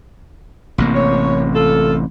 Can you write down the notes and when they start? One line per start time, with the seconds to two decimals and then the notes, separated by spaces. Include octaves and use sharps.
0.78 A1 C3 A#3
0.95 C#5
1.55 F4 A4